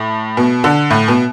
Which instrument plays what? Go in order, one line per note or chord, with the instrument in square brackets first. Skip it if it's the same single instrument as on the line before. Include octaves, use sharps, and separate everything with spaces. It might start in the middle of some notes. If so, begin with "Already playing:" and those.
Already playing: [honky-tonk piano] A2
B2
D3
A2
B2